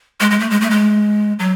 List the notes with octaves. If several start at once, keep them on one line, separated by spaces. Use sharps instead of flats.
G#3
G#3
A3
G#3
A3
G#3
F#3